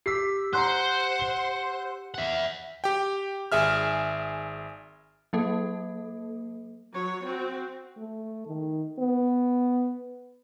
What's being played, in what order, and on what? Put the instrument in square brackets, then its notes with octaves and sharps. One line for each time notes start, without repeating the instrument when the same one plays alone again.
[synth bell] G4 E6 [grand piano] D6 B6 C7
[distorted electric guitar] C5 [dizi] F#5 [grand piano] A#5 C6 F#6
[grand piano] G7
[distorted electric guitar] E5 F#5
[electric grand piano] G4 G5
G#1 G#4 E5 F6
[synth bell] F#3 A#3 A4
[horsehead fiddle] F#3 C#5
C4 F#4
[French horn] A3
D#3
B3